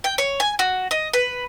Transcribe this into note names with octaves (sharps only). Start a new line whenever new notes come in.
G5
C#5
G#5
F#4
D#5
B4